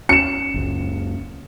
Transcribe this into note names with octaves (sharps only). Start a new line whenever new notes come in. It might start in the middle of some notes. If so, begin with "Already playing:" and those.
C#4 C#7 E7
F#1 C#2